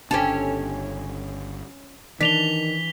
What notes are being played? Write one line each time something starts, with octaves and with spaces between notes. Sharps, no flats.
G1 C#3 C#4 D4 G4 A4
D#3 E3 D4 B6 F7 G7